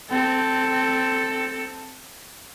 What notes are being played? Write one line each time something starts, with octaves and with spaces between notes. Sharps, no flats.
C4 A4